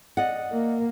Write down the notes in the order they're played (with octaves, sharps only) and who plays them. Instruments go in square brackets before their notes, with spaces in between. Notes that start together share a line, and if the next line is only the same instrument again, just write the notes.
[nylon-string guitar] D5 D#5 F#5
[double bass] A#3